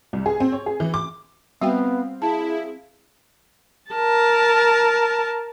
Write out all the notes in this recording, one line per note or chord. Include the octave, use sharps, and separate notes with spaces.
C2
G#4
C4
C#5
G#4
E3
D6
G3 B3 C4 F#4 F5 G5
E4 G#4 A5
A#4 A5